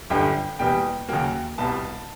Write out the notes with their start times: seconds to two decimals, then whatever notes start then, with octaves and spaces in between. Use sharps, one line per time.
0.10 G1 F#2 D3 G3 G5
0.59 E2 B2 G3 A#3 G5
1.09 D#2 C#3 F#3 A#3 G5
1.58 C2 B2 G3 A5